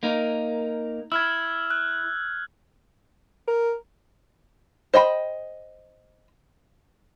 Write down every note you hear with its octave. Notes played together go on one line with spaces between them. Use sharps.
A#3 D#4 A#4
E4 E6 F6 G#6
F#6
A#4
C5 D#5 G5 B5